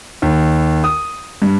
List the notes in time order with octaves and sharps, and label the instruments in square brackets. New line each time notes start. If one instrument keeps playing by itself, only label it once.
[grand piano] D#2
D#6
G2